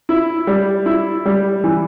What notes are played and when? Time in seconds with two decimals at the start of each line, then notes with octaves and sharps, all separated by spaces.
0.09 E4
0.47 G3
0.86 E4
1.26 G3
1.64 E3